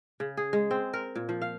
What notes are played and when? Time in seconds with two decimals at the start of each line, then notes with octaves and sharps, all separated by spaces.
0.20 C#3
0.37 G#4
0.53 G#3
0.71 C4
0.93 A#4
1.16 A#2
1.29 F3
1.42 F5